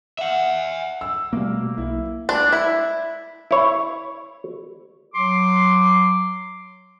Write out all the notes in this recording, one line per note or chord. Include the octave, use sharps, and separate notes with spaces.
E5 F#5
E6
B2 G3 A3 A#3
B1 E4
D4
E4
E4 C#5
F#3 C6 D6